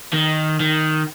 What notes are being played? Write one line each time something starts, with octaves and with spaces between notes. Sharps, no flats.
D#3
D#3